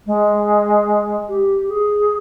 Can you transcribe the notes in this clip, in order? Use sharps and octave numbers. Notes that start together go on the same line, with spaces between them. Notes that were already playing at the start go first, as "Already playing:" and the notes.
G#3
G4
G#4